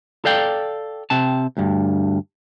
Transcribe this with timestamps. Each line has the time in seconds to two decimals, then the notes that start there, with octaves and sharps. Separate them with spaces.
0.25 A4 D5 F5 G5
1.10 C3 C4 A5
1.57 D2 G2